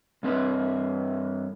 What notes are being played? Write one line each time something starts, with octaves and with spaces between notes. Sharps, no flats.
G2 C4 B4